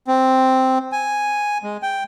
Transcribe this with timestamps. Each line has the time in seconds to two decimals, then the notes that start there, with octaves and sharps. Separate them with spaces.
0.08 C4
0.92 G#5
1.63 G#3
1.82 G5